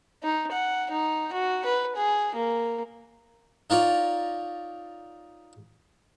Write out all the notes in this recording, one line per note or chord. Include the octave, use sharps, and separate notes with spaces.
D#4
F#5
D#4
F#4
B4
G#4
A#3
D#4 F4 A#4 C#5 D5